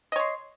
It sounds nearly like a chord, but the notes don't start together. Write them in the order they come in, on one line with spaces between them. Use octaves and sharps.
D#5 C#5 C6